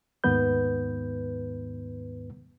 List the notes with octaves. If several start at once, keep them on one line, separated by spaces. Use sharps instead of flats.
D#2 G#2 D#3 B3 B4 G6